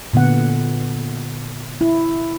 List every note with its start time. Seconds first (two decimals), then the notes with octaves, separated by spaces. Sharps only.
0.13 A#2 D3 B3 F#5
1.81 E4